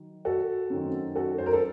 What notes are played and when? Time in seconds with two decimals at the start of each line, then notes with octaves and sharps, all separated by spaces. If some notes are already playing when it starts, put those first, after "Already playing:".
Already playing: D#3 F#3
0.25 F#4 A4
0.70 F#2 D#3 F#3 A3 C4
1.15 F#4 A4
1.38 C5
1.46 A#4
1.53 A4